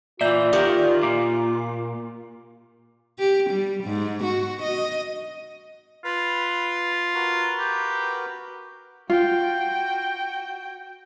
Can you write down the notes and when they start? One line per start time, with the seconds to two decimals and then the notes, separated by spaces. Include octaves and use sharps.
0.21 A#2 E3 F4 D5 E5 G6
0.53 D#3 G4 A#4 F#5
1.03 A#2 D6
3.19 G4
3.50 G3
3.84 G#2
4.24 F#4
4.63 D#5
6.05 F4 B4 B5
7.15 F#4 A#4 B4
7.59 G4
9.10 F4 F#4 G5